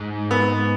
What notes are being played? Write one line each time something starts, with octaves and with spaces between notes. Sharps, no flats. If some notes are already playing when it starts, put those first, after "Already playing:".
Already playing: G#2
B3